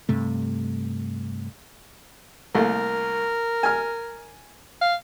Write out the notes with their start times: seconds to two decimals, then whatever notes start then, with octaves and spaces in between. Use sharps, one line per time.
0.09 G2 C3 A3
2.55 C2 A3 A#3 A#4
3.63 G#5 F6
4.81 F5